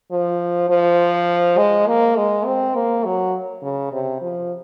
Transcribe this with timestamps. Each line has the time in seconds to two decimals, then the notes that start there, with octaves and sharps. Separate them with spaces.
0.11 F3
0.70 F3
1.57 G#3
1.87 A#3
2.16 G#3
2.45 C4
2.75 A#3
3.05 F#3
3.63 C#3
3.92 C3
4.21 F3